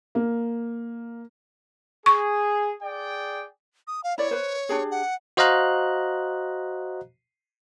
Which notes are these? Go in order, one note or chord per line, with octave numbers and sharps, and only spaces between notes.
A#3
G#4 C#6
G#4 D5 G5
D#6
F5
E4 C#5 D5
B4 C5
D4 G4 G#4
F#5
F#4 C5 D#5 F5 A#5 F#6